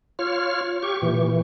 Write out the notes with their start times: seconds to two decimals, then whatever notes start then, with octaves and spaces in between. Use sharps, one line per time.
0.19 F4 C#5 F6
0.83 G4 C#6
1.02 A#2 E3